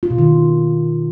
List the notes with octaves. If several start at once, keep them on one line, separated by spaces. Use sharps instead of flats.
F4
B2
D#3